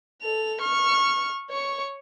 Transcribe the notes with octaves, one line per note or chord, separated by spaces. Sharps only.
A4 F7
C#6 F6
C#5 C#6